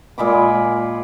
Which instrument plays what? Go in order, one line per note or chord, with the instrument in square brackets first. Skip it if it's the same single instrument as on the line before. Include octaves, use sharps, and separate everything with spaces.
[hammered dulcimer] A#2 G#3 B5 D6